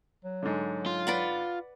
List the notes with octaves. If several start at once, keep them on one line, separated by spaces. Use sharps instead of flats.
F#3
G#2 D3
F4
B4 D5 F#5